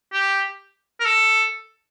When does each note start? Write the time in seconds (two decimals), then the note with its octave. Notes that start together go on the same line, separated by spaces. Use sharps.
0.13 G4
1.00 A#4
1.06 A4